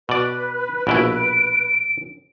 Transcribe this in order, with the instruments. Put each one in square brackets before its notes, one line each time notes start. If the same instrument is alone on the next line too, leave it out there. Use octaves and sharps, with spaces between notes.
[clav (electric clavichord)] B2 D5 [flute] B4
[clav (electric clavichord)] A#1 B2 E4 [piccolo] D7